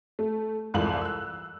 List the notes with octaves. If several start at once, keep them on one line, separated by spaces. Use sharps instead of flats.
A3
C2 F2 G#2 E3 F5 F#7
E6 F#6